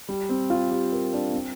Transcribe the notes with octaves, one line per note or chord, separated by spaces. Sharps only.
G3
C4
F4
G4
A#4
D4
C4